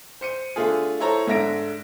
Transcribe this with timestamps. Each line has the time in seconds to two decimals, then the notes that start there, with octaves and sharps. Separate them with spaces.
0.21 C5 C#7 D#7
0.56 D3 A3 F4 G#4
1.00 E4 A4 C5 C#5 A#5
1.27 G#2 D3 E5 A#6 D7